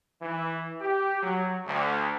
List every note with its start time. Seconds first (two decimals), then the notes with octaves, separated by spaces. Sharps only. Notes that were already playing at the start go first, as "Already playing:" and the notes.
0.21 E3
0.81 G4
1.22 F#3
1.66 D2